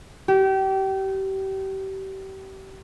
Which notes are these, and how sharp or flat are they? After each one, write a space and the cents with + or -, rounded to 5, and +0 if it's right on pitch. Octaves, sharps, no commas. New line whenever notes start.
G4 -30